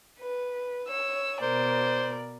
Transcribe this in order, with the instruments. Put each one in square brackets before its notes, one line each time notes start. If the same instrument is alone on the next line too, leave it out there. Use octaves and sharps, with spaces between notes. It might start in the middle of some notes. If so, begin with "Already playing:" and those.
[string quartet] B4
C#5 E6
[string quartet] B2 A#4 D5 [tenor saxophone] C5